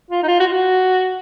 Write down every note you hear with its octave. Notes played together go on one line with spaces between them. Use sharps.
F4
D#4
F4
F#4
F4
F#4